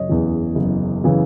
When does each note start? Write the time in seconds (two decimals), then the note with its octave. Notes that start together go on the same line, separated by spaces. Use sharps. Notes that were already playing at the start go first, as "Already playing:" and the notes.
Already playing: F#1 C#5 D#5
0.09 E2 C#3 E3
0.55 F#1
1.04 C#3 E3